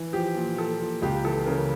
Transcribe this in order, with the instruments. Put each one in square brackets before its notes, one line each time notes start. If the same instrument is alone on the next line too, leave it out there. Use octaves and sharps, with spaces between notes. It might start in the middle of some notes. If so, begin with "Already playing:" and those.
Already playing: [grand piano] E3
F3 G4
A#2
A#2 A4
A#2
C#2 G4
E3 A4
C#3 A#4